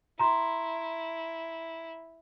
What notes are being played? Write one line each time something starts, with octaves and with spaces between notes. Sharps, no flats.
E4 A#5 C6